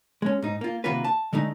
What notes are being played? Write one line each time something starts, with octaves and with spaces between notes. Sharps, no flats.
G#3 C#4
G#2 D#4
A#3 F4
C3 D#3 A#3 F4 F#4 B4
A5
D3 G#3 A3 D#4